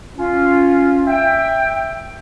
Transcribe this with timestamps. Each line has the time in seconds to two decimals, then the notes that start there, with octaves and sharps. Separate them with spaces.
0.17 C#4 F4
1.07 E5 G5